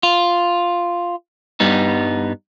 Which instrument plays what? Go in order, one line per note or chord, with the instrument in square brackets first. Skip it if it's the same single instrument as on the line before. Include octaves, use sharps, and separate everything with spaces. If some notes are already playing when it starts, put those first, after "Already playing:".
[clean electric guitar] F4
G2 G3 B3 D#4